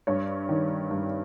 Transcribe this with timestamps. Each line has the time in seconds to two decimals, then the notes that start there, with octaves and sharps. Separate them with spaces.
0.07 G2 C#5
0.49 D#3
0.91 G2